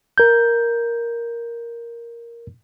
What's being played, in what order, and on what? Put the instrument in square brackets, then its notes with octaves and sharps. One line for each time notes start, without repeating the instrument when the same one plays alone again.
[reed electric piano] A#4 G6